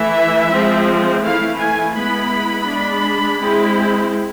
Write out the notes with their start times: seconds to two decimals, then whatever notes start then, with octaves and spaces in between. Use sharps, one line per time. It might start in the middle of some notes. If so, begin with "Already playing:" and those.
Already playing: E3 A3 E4 E5
0.51 F3 G#3 C4
1.22 E3 A3 E4 F5
1.59 G#5
1.94 G#3 B3 E4 B5
2.67 G#3 D4
3.39 G#3 C4 E4